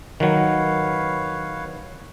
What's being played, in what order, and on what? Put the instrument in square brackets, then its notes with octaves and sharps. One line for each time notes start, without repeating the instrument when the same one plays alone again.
[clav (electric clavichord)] D#3 F#3 [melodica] B4 C#5 F5